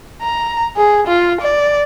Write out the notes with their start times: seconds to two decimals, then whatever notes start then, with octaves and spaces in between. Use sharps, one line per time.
0.22 A#5
0.77 G#4
1.07 F4
1.41 D5